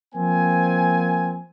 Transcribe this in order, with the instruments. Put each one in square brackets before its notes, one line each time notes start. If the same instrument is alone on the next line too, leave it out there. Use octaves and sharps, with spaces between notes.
[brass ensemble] F3 A#3 C4 G#5